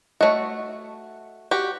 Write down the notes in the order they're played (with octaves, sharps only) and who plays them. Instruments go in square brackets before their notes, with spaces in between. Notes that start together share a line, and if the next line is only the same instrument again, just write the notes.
[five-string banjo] A3 F#4 [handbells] C#5 D#5
[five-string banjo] F#4 G4